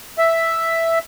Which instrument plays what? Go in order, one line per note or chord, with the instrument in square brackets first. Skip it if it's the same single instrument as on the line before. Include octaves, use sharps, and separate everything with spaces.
[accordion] E5